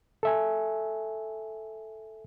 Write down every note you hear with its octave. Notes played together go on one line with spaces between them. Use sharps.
A4 E5 G#5